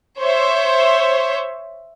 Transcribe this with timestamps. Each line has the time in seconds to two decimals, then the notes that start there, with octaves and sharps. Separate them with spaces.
0.18 C5 C#5 E5